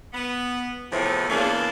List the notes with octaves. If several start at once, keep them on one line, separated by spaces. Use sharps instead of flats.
B3
E2 A2 C3 F3
E2 C#3 A#3 D4